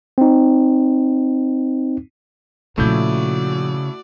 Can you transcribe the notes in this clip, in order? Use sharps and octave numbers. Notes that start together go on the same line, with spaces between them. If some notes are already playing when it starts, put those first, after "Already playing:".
C4 D#4
A#2 C#3 F3 A3 E4 F#4 D5 G6